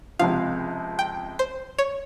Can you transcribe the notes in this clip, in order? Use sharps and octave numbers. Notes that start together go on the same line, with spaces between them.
C#2 C3 F3 F5
G5
C5
C#5